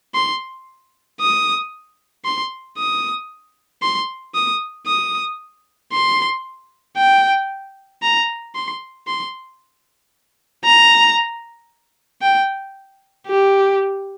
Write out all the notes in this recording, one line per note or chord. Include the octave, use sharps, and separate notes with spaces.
C6
D#6
C6
D#6
C6
D#6
D#6
C6
G5
A#5
C6
C6
A#5
G5
G4